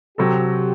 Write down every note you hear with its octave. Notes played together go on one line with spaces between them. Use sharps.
C3 F#3 C4 F#4 G4 A4